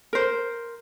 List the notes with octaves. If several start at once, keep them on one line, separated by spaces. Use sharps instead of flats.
A#4 C5